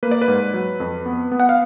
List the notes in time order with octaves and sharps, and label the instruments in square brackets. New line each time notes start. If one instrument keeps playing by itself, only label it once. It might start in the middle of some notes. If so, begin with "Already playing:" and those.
[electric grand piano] A#3 B4
D5
B4
G#2
F#3
F2
B3
B3
F#5
F5